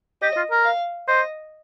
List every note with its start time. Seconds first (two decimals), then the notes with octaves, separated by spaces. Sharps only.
0.22 G4 D#5
0.36 F4
0.51 A#4
0.65 F5
1.08 C5 D#5